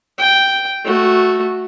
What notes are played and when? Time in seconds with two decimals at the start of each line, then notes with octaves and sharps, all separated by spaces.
0.18 G5
0.84 A3 F#4